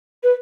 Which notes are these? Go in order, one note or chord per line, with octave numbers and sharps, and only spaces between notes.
B4